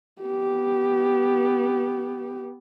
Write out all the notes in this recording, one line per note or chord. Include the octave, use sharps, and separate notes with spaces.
B3 G4